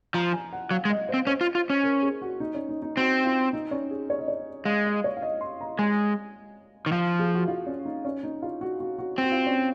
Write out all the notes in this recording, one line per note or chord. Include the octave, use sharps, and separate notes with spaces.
F3 A#5
G#5
F#5
F#3 F5
G#3
D#5
C4 C5
C#4 C5
F4
F4
C#4
A#4
G#4
F#4
D#4
C#4
D#4
D#4
C4 F#4
F4
D#4
C#4
G#4
C#5
D#5
C#5
G#3 F5
D#5
C#5
F5
D#5
C6
A#5
G#3 G#5
D#3
F3 F5
G#4
F#4
F4
C#4
D#4
C#4
D#4
F4
F#4
F#4
F#4
C4 F#4
F4
C#4